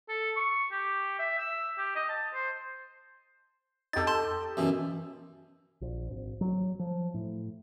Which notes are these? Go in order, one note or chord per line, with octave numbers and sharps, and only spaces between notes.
A4
C#6
G4
E5
E6
G4
D#5
A5
C5
F2 D#4 G4 A4 A6
A5 C6
F#2 B2 E3
A#1
G#1
F#3
F3
A2